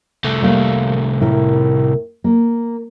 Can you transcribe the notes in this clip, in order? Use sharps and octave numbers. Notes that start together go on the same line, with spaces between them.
C2 A3
G3 A#3 F5
A2 E4 A#4
A#3